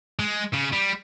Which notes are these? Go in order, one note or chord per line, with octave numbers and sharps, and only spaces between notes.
G#3
C#3
G3